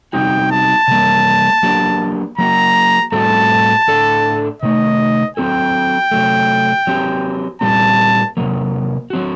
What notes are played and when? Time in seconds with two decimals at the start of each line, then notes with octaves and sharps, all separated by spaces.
0.13 C3 G3 C4 D#4 F#4 G5
0.51 A5
0.88 C3 G3 A#3
1.63 F#3 A#3 D4 G4
2.38 F#3 A#3 F#4 A#5
3.12 A2 G3 C4 F#4 A4 A5
3.88 A2 A3 D4 A4
4.62 C3 D#3 A3 D#5
5.36 F#3 C4 F#4 A4 G5
6.11 C3 F#3 A3
6.87 F#3 C4 G4
7.61 A#2 G3 C4 G4 A5
8.37 C3 F#3 A#3
9.10 F#3 C4 F#4